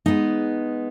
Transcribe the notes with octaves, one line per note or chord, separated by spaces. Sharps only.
G#3 B3 D#4